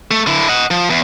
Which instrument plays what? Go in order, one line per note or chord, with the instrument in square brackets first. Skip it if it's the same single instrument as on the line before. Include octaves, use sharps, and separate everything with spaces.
[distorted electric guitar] A3
D3 E4
D#5 F#5
F3
E2